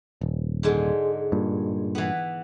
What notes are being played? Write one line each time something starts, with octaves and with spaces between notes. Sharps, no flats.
D#1
G#2 D3 G#3
G2 A#2
E3 B3